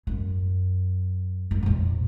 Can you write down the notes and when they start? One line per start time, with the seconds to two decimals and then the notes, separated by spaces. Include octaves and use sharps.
0.07 F#2
1.51 F#2
1.63 A#1 F2